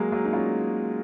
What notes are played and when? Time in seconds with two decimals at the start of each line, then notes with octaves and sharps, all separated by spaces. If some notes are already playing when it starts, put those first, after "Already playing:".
Already playing: F#3 G#3 A#3
0.12 F#3 A#3
0.25 D#4
0.33 C#4 F4